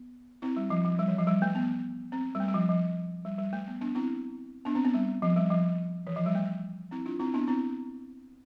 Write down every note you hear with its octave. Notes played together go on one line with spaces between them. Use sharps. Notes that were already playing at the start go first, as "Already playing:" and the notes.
Already playing: B3
C4 E4
G3
F3
F3
G3
E3
F3
G3
A3
B3
C4
G3
A3
G3
F3
F3
G3
G3
A3
B3
B3 D4
C4 E4
B3 D4
C4
B3
G3
F3
G3
F3
E3
F3
G3
A3
C4 E4
D4 F4
C4 E4
B3 D4
C4 E4